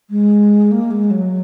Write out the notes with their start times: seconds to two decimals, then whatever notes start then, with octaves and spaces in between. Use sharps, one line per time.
0.10 G#3
0.71 A#3
0.91 G#3
1.10 F#3